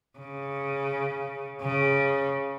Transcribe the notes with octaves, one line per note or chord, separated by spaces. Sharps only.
C#3
C#3